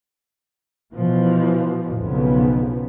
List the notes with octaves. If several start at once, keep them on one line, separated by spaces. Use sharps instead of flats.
B2 E3 F3
B1 F2 C#3 F3 B3